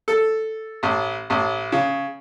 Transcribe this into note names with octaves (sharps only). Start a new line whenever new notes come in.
A4
A1
A1
C#3